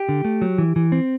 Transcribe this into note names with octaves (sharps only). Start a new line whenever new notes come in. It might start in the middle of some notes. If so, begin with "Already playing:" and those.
Already playing: G4
D3
A3
F#3
E3
E3
C4